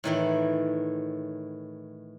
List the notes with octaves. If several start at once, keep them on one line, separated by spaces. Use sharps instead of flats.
A2 D#3 E3